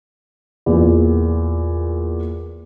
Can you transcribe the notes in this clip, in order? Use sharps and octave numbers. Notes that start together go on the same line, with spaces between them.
E2 A#2